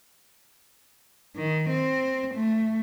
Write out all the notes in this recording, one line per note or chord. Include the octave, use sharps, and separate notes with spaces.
D#3
C4
A3